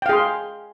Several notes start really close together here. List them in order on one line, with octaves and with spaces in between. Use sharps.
G5 F5 G#4 C6